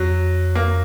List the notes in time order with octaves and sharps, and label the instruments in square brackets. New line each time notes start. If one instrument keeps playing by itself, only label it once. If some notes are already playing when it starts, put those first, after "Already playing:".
Already playing: [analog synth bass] F2 [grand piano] F#3
[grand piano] A#3